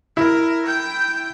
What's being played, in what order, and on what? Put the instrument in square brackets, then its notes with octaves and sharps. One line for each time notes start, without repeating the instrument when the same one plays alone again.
[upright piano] E4 [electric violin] A#4
[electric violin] G5 G6